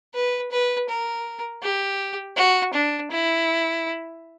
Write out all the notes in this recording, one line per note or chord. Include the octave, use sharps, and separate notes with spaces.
B4
B4
A#4
G4
F#4
D4
E4